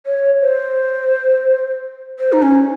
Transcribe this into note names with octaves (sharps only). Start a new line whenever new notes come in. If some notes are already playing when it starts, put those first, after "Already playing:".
C#5
C5
C5
D#4
C#4